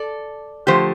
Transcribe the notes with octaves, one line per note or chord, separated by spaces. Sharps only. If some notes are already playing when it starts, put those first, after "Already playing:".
Already playing: A4 D5
D3 F3 A3 G4 C5